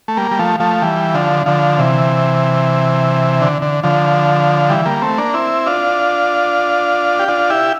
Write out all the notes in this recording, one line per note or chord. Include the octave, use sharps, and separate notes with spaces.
A3
G3 A#3
G3
F3 A3
F3 A3
E3 G3
D3 F3
D3 F3
C3 E3
D3
D3
D3 F3
E3 G3
G3 A#3
A3 C4
A#3 D4
C4 E4
D4 F4
G4
D4 F4
E4 G4